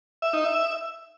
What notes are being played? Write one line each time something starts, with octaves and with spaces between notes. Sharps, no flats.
E5
D#4
E5